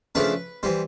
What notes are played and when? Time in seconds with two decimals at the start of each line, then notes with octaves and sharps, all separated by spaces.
0.15 C#3 F3 A3 D4 B4
0.63 E3 G3 C5